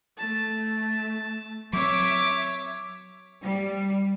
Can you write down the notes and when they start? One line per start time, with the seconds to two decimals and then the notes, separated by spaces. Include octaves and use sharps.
0.18 A3 A5
1.73 F#3 C4 C#5 E5 D6
3.43 G3